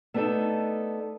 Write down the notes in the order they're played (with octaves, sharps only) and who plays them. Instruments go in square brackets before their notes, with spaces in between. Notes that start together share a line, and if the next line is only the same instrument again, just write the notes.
[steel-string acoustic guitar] A3 B3 D4 D#4 A4